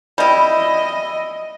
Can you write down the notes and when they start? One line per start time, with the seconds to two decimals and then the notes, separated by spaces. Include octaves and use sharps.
0.18 G3 E4 D#5